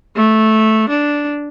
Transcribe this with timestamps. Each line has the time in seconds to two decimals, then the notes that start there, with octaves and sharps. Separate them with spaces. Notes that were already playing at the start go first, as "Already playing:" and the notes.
0.16 A3
0.90 D4